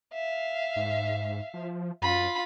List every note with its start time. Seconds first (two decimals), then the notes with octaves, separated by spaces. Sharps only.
0.13 E5 F5
0.76 G#2
1.54 F3
2.02 F#2 F4 B5